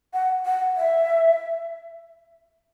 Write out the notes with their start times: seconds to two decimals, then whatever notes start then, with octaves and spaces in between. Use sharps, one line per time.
0.14 F#5
0.45 F#5
0.77 E5